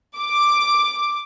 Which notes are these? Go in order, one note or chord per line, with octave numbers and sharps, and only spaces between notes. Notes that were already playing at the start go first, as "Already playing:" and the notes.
D6